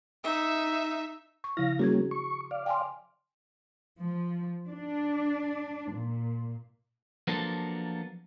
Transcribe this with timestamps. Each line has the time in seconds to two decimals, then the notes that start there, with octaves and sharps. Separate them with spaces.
0.24 D#4 E5
1.44 C#6
1.57 C#3 F3 E4 F5 A#6
1.79 G3 A#3 C#4 F#4 G#4 G#6
2.11 C#6
2.51 D5 F5
2.66 G5 G#5 C6
4.00 F3
4.67 D4
5.91 A#2
7.27 F3 F#3 A#3 B3 D4 A4